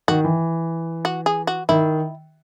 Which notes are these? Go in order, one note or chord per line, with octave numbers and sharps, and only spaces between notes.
D#3 F#4
E3
F#4
G#4
F#4
D#3 E4